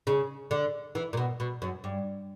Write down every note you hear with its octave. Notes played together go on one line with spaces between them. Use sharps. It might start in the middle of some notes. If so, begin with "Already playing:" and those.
C#3
D3
E3
A#2
B2
B2
F#2
G2